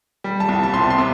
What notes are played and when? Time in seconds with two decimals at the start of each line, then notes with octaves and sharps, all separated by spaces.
0.24 G3
0.40 A5
0.49 C2
0.63 A5
0.74 C3 C6
0.90 C6
0.98 C3